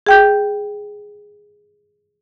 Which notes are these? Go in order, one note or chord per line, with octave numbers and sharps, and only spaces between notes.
G#4 G5 G6